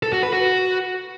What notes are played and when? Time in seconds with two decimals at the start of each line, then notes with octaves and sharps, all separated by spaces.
0.03 A4
0.13 F#4
0.23 B4
0.33 F#4